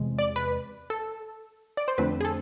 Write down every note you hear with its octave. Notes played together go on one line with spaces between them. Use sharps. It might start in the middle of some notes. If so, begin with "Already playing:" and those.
Already playing: E2 C3 G#3
D5
B4
A4
D5
C5
F2 D3 A3 C4 B4
G#4
A4